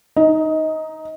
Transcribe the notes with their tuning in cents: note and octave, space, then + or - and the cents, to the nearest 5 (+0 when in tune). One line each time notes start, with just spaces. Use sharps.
D#4 +0 D#5 +20